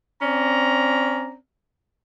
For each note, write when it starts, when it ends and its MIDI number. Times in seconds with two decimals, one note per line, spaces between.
0.22 1.35 60
0.22 1.35 61
0.22 1.35 74
0.22 1.35 82